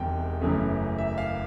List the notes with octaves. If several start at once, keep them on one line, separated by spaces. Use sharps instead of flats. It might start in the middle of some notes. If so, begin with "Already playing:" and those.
Already playing: E1 E2 C3 D#3 G#3 G5
F#1 F#2 C#3 E3 A3
E5
F5